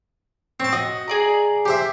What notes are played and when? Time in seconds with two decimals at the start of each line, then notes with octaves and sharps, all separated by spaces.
0.60 C4 C#5 A5
0.73 F#4 D#5
1.08 G#4 D5 A#5
1.65 G4 C5 E5